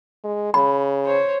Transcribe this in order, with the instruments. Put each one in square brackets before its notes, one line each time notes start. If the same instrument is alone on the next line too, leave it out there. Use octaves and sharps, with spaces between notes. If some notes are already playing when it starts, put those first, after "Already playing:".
[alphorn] G#3
[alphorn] C#3 [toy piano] B5
[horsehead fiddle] C5 C#5